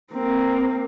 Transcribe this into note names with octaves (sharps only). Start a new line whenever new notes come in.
A#3 C4